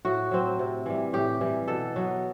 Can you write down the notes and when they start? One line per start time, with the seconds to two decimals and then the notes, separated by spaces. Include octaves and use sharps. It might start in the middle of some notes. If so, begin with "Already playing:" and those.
0.05 A2 F#4
0.31 F#3 C4
0.59 C3
0.86 E3 G3
1.13 A2 G4
1.41 E3 G3
1.68 B2 A4
1.96 F#3 B3